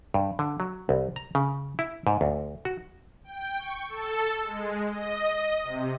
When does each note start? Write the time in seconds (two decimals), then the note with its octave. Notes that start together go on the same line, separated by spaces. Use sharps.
0.14 G2
0.39 D3
0.60 F#3
0.89 C2
1.16 A#5
1.35 C#3
1.79 E4
2.07 G#2
2.21 D2
2.65 F#4
3.24 G5
3.59 C#6
3.89 A4
4.43 G#3
4.90 D#5
5.63 C3